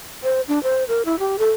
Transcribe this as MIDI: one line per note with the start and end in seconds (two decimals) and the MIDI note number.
0.23 0.41 72
0.48 0.61 62
0.63 0.84 72
0.88 1.05 70
1.05 1.18 64
1.19 1.36 67
1.39 1.50 69